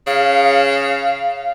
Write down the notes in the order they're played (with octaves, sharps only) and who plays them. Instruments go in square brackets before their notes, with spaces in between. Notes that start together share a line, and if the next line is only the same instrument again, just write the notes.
[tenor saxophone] C#3 [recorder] F5